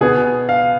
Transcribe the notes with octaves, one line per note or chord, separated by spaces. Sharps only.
B2 B3 G#4
F5